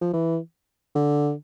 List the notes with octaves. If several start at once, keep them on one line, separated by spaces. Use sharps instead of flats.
F3
E3
D3